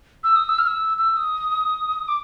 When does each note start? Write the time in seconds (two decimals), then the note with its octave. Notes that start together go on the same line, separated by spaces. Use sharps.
0.24 E6
0.36 D#6
0.49 E6
0.58 F6
0.67 E6
0.97 E6
1.17 D#6
2.08 D6